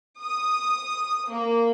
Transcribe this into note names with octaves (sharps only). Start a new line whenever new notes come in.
D#6
A#3